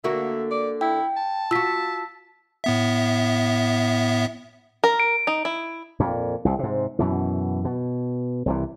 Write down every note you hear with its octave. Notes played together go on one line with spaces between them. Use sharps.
D3 A#3 F#4 E5
D5
E4 G5
A5
F4 F#4 E6 B6
A2 B3 E5
A#4
D7
D#4
E4
F2 A#2
C2 C3
G#2 C3
F#2 B2 E3
B2
C2 C3 E3